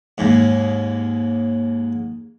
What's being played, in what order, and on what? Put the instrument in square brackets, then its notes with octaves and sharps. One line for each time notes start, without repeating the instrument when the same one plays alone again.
[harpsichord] D#2 G#2